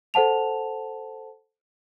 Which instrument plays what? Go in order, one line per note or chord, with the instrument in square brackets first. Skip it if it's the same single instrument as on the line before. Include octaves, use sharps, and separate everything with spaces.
[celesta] A4 C5 F#5 A5 F7